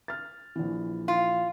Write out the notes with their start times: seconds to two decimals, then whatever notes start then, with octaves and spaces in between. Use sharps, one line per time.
0.08 F6 A6
0.56 A#1 E3
1.08 F4